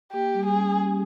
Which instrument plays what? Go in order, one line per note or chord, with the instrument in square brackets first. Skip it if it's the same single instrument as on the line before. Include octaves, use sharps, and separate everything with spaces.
[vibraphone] A#3 [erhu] G4
[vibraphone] G3
[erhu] G#4
[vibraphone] C#4
G4